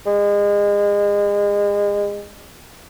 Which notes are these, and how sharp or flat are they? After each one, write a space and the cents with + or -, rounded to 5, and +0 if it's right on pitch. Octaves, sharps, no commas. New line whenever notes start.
G#3 -30